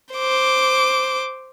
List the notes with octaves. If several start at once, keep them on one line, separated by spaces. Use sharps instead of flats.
C5 D6